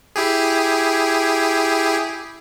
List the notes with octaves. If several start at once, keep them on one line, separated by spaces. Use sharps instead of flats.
E4 G4 G#4